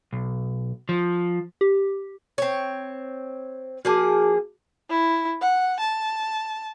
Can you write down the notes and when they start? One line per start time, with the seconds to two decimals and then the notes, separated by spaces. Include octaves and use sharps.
0.13 B1
0.89 F3
1.61 G4
2.38 C4 C#5
3.85 F3 A#3 F#4 G#4 A5 D6
4.90 E4
5.42 F#5
5.80 A5